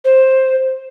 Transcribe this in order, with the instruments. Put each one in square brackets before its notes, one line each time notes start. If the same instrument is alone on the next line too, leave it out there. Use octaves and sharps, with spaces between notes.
[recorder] C5